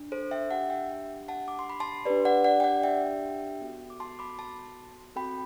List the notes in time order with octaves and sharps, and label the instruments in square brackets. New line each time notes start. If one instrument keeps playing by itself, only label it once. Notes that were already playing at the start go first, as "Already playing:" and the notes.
Already playing: [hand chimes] D4
A4 C5
E5 G5
D4 G4 F#5 A5
E5 G5
F#5 A5
D6
C6
B5
A5 C6
D4 G4 B4 D5
D5 F#5
D5 F#5
G5
D5 F#5
E5 G5
B3 F#4 A4
D6
A5 C6
B5 D6
A5 C6
C4 F#4 A4 G5 B5